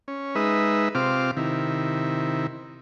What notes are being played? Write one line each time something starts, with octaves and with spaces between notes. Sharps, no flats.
C#4
G#3 D#4 B4 E5
C3 C4 F4 D6 F6
C3 D#3 E4